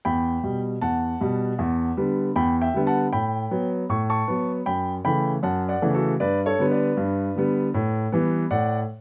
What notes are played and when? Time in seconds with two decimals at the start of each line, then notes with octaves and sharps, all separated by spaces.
0.05 E2 G5 B5
0.44 B2 G3
0.81 E2 F#5 A5
1.20 B2 G3
1.59 E2
1.97 D3 G3 B3
2.36 E2 G5 B5
2.62 E5 G5
2.74 D3 G3 B3
2.87 F#5 A5
3.13 A2 G5 B5
3.51 F#3 B3
3.89 A2 C#6
4.10 A5 C#6
4.28 F#3 B3
4.66 F#2 G5 B5
5.04 C#3 E3 A3 G5 B5
5.43 F#2 F#5 A5
5.69 D5 F#5
5.82 C#3 E3 A3
5.94 F#4 A4
6.20 G2 B4 D5
6.46 A4 C#5
6.59 D3 G3 B3
6.71 B4 D5
6.97 G2
7.36 D3 G3 B3
7.74 A2
8.12 E3 G3 B3
8.51 A2 D5 F#5